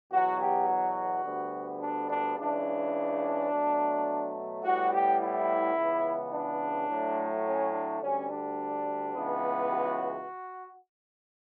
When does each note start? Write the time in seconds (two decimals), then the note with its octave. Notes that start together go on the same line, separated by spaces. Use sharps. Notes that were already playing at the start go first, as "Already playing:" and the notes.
0.12 E2 B2 F#3 F#4
0.39 G4
0.68 F#4
1.24 D2 D3 G3 B3
1.81 D4
2.09 D4
2.37 C#2 C#3 E3 D4
3.50 B2 F#3 A3
4.63 A2 G3 B3 F#4
4.91 G4
5.20 E4
5.75 C#2 C#3 E3 B3
6.32 D4
6.89 A2 F#3 A3
7.45 C#4
7.73 D4
8.01 D2 D3 G3 C#4
8.29 D4
9.14 C#2 C#3 E3 B3
9.71 F#4